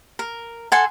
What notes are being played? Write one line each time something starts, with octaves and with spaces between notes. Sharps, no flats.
A#4
A4 F#5 G#5 C6